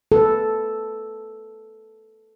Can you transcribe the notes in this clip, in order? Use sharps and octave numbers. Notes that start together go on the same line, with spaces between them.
A4 B4